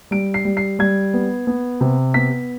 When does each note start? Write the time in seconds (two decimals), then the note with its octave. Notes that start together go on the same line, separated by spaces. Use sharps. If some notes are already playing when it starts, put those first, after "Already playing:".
0.11 G3 D7
0.34 C7
0.45 G3
0.57 C7
0.79 G3 G#6
1.14 B3
1.47 B3
1.81 C3
2.14 B3 B6